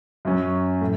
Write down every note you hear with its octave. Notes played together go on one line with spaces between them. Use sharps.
F#2 F#3 C#4
A2